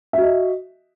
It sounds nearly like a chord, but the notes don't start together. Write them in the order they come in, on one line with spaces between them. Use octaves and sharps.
E5 F#4 D#5